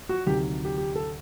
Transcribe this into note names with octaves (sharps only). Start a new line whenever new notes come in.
F#4
D2 C3 D#3 F#3 G4
G4
G4
A4